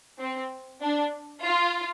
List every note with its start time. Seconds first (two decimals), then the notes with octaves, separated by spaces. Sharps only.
0.19 C4
0.81 D4
1.43 F4